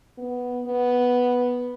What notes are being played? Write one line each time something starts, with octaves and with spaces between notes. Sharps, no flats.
B3
B3